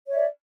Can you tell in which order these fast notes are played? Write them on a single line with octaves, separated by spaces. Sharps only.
C#5 E5 D5